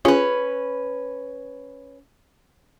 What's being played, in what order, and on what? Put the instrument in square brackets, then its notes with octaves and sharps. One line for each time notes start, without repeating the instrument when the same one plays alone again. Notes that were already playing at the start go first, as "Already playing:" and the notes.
[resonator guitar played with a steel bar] C#4 B4 [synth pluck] F4 G#4 C#5